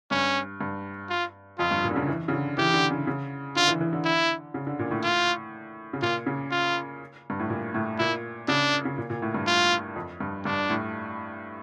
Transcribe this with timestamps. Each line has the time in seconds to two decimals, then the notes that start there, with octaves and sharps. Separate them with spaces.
0.11 G2 C#4
0.61 G2
1.10 F4
1.59 F2 F4
1.71 G2
1.84 A#2
1.91 D3
1.96 C#3
2.08 E3
2.28 C#3
2.33 D3
2.58 E3 G4
2.74 D3
2.90 C#3
3.07 C#3
3.56 D3 F4
3.68 E3
3.81 E3
3.93 D3
4.05 E4
4.54 C#3
4.67 D3
4.79 A#2
4.91 A2
5.04 F4
5.93 C#3
6.02 A#2 F4
6.26 C#3
6.51 F4
7.30 G2
7.40 A2
7.50 A#2
7.74 A2
7.99 A#2 E4
8.48 C#3 D4
8.85 C#3
8.98 A#2
9.10 A#2
9.22 A2
9.34 G2
9.47 F4
9.96 F2
10.20 G2
10.45 G2 D4
10.70 A2